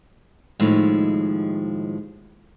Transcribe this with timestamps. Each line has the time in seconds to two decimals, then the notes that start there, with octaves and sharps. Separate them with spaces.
0.60 D#2 A2 F3 G#3